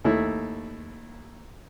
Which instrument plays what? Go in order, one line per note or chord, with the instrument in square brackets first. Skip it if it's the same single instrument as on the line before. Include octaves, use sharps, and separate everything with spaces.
[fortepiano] D#2 A3 E4